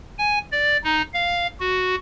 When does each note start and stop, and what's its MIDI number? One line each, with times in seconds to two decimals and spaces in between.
0.19 0.39 80
0.52 0.77 74
0.84 1.02 63
1.14 1.47 77
1.60 1.95 66